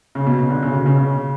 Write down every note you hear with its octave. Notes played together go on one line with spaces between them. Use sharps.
C#3
B2
C#3
D3
C#3
B2
C#3
C#3